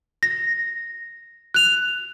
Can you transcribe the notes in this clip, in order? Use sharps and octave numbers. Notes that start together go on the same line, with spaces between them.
A#6
F#6 F7